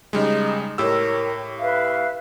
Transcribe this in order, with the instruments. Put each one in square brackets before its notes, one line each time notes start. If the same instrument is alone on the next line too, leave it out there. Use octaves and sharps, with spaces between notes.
[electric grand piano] C#3 G3 G#3 [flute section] D#4
[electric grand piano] A2 G4 E6 [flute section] A#4 C#5
[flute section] B4 E5 F5